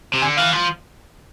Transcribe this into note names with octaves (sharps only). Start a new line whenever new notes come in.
C3
D3 G#5
E3 F5
F3